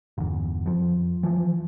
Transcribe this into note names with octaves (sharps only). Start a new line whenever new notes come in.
G1 E2
F2 F3
E3 F3